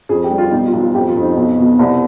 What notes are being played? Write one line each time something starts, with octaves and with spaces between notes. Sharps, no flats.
F2 G#4
G4
G3
F4
B1 D#4
F4
B1
F4
F2 G4
F4
F2
D#4
B1
B2
C2